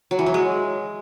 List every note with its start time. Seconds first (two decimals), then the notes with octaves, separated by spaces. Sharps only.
0.11 F#3
0.19 E3
0.26 F#3
0.34 G#3